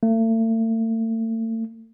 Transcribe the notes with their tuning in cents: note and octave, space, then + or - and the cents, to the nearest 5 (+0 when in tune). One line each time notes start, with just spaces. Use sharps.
A3 +40